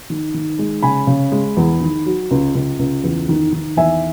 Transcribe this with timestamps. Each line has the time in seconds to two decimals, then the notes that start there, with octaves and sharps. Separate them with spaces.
0.10 D#3
0.34 D#3
0.59 G#3
0.83 C#3 G#5 B5
1.07 C#3
1.32 G#3
1.57 E2
1.81 D#3
2.06 F#3
2.31 C#2
2.55 C#2
2.79 C#2
3.04 E2
3.29 D#3
3.52 D#3
3.77 E2 E5 G#5